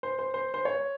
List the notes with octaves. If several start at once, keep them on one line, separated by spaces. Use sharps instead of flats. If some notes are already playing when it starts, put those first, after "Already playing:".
C5
C5
C5
C5
C#5